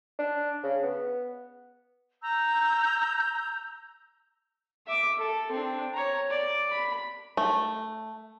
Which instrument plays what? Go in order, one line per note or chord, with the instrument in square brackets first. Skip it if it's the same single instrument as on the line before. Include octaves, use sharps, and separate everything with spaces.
[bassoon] D4
C#3
B3
[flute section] A#5 E6 G6
[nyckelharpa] E5 D6
A4
C4 D4
C#5 A#5
D5
B5
[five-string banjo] A3